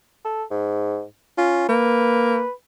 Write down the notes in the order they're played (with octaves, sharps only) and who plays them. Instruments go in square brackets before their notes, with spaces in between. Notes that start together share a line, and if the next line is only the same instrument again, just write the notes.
[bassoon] A4
G#2
[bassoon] C#4 [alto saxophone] F4
[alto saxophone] A#3 [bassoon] B4